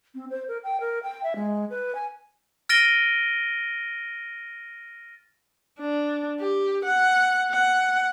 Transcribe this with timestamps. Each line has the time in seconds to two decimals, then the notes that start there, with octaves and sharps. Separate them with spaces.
0.15 C4
0.30 C5
0.48 A#4
0.63 G5
0.80 A#4
1.03 G5
1.23 E5
1.35 G#3
1.70 B4
1.95 G#5
2.69 F6 A6 A#6 D7 D#7 G7
5.80 D4
6.40 G4
6.85 F#5
7.50 F#5